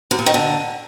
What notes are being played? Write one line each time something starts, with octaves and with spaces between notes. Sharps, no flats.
F#2
A#2
D#3
D3